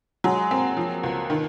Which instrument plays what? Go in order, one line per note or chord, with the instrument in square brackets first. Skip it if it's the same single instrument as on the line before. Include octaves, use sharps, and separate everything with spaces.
[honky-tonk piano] F#3 [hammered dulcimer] G#3
[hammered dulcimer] A#3 [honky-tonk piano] C4
[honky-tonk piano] F3
C#2
D#3